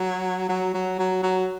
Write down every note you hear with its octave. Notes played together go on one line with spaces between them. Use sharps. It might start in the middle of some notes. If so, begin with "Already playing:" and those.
Already playing: F#3
F#3
F#3
F#3
F#3